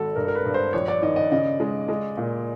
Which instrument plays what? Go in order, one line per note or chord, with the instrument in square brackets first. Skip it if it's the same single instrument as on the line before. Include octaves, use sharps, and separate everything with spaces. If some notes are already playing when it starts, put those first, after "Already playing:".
Already playing: [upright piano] G#1 [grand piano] F#4 A4
[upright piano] G2 [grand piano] A#4
[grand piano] A#4
B4
[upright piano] G2
[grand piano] C5
[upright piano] A#1 [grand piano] C#5
[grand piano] D5
[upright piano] D#3 [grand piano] D#5
[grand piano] D#5
[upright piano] C#3 [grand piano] D#5
[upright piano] G#3
G#3
A#2